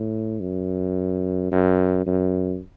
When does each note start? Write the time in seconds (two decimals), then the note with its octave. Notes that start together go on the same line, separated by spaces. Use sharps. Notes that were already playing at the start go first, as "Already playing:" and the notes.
Already playing: A2
0.40 F#2
1.51 F#2
2.06 F#2